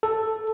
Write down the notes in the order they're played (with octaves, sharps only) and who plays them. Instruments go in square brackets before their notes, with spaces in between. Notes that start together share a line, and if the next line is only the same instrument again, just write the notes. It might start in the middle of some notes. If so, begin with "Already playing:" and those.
[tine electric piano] A4